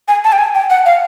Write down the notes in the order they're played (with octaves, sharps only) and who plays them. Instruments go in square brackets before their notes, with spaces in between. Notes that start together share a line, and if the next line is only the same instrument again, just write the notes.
[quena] G#5
A5
G5
G#5
G5
F#5
F5